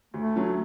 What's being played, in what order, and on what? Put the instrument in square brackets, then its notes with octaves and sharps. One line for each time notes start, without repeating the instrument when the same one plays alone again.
[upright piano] D2 [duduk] A3
[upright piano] D3 F#3 C#4